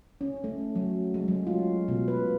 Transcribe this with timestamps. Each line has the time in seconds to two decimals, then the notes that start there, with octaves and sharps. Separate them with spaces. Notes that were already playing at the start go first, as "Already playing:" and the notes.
0.21 C#4
0.44 A3
0.75 F#3
1.14 G#3
1.28 F#3
1.47 F4
1.88 B2
2.08 B4